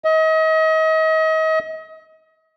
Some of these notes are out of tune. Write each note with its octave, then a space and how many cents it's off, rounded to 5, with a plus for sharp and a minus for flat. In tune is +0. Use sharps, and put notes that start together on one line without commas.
D#5 +35